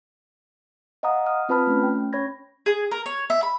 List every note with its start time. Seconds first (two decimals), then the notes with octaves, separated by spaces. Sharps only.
1.03 D#5 F5 F#5 A#5 D#6
1.26 D#6 F6
1.49 C4 F4 B4 A5 B5 F6
1.67 A3 C#4
1.83 G5
2.13 C#4 C#5 B5 G#6 A#6
2.66 G#4
2.91 A#4
3.06 C#5
3.30 E5
3.43 B5